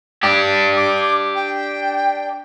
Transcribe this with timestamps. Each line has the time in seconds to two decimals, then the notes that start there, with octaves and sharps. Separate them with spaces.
0.23 D4 G4
0.76 D6
1.35 G5